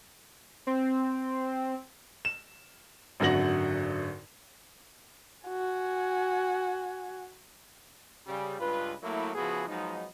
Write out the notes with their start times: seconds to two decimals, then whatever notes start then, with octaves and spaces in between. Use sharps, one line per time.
0.67 C4
2.25 E7
3.20 G#1 F#2 D3 F#4 A#6 F#7
5.47 F#4 G#5
8.27 C#3 G3
8.60 C#2 G2 F4 B4
9.03 F#3 A3 A#3 E4
9.35 C#3 F3 B3 E4 F#4 G#4
9.68 F3 F#3 G#3 B3 D#4